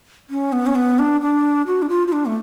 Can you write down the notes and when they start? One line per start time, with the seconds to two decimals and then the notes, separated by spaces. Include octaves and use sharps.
0.30 C#4
0.52 B3
0.66 C#4
0.75 B3
0.99 D4
1.21 D4
1.67 F#4
1.82 D4
1.89 F4
2.07 F4
2.12 D4
2.26 A3